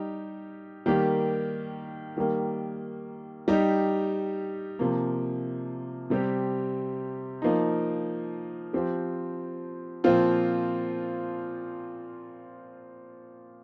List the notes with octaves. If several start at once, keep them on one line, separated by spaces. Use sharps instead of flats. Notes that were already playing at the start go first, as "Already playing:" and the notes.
Already playing: G3 D#4 G4
D#3 G3 A#3 G4
D#3 G3 A#3
G3 D#4 G4
C3 F3 A#3
C3 G3 C4 G4
F3 A#3 D#4
F3 C4 G4
A#2 F3 C4 F4